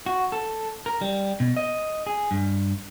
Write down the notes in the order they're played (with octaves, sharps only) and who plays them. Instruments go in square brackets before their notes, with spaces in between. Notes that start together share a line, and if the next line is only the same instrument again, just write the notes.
[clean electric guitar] F#4
A4
A#4
G3
B2
D#5
G#4
G2